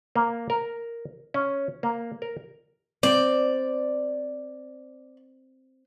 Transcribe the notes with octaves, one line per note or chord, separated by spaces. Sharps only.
A#3
A#4
C#4
A#3
A#4
C4 D5